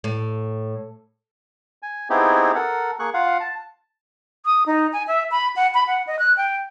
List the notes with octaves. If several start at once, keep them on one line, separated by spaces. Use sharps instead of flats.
A2
G#5
B3 C4 D#4 E4 G4 G#4
A4 A#4 F#5
A#3 G#4 C#6 F#6
F4 F5 F#5
A5
D#6
D#4
G#5
E5
B5
F#5
B5
F#5
D#5
F#6
G5